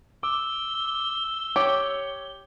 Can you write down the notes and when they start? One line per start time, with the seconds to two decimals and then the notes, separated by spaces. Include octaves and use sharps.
0.23 D6 E6 G7
1.56 G4 C#5